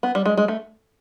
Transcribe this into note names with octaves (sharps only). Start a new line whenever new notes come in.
B3
G3
G#3
G#3
A3